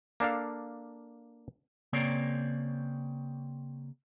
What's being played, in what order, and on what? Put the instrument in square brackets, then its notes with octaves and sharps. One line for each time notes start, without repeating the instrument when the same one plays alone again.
[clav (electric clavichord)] A#3 D4 A4 F5
[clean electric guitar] C#3 A#3 C4 C#5 D5